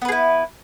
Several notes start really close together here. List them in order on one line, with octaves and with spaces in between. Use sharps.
B3 B4 G#4 E4